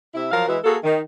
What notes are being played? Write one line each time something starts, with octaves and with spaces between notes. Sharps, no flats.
C3 E4
F3 F#3 A#4 F5
E3 G#3 E4 F#4 B4
A#3 F#4 G#4 A4
D#3